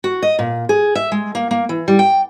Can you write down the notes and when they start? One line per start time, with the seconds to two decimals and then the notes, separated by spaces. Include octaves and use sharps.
0.04 F#4
0.22 D#5
0.39 A#2
0.69 G#4
0.95 E5
1.12 G#3
1.35 A#3
1.51 A#3
1.69 E3
1.88 G3
1.99 G5